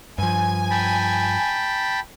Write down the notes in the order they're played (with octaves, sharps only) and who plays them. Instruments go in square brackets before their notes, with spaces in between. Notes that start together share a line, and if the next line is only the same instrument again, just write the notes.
[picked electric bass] G2 F3 [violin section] G#5
[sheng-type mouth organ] G5 A5 B5